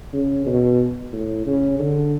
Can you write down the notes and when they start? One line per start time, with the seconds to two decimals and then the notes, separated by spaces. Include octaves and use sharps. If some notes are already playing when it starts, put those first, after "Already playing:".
0.13 C#3
0.46 B2
1.13 A2
1.46 C#3
1.79 D3